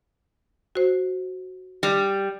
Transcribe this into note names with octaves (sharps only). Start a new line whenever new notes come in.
F#4 C5
G3